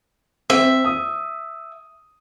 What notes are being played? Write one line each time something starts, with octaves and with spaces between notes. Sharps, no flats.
C4 E5
D#6